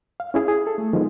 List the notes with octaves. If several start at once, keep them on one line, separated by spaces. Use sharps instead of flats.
F5
C#4 E4 G#4
G#4
A4
A3
D#3 F3 G#3 B3